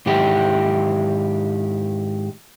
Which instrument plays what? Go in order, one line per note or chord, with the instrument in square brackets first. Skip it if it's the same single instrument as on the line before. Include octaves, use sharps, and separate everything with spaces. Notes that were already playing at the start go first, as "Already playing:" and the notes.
[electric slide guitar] G#2 D#3 E4 G4